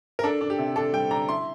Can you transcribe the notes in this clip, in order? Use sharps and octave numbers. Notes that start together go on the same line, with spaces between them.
A#4
D4 A4
D4
G4
C3
D4 A4
G3 G5
D4 A#5
E4 C6